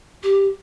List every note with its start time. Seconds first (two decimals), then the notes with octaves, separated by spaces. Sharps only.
0.23 G4